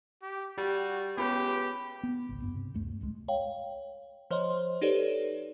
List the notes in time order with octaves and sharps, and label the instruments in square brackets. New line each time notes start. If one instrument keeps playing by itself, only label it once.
[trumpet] G4
[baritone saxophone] G3 [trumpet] F#4 [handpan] G4
[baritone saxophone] C#2 [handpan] B3 C#5 [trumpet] G4 [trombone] B4
[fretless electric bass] B3
G#1 C#2
D#1 G2 B3
C3
D2 G2 A3
D1 C2 G#3
[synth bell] C#5 F5 G5
F3 C5 C#5 D#5 C6
D#4 G4 A4 B4 C#5 D5